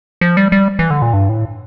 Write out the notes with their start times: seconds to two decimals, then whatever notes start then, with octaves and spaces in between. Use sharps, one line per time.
0.21 F3
0.37 G3
0.52 G3
0.79 E3
0.90 D3
1.02 A#2
1.13 G2
1.29 A2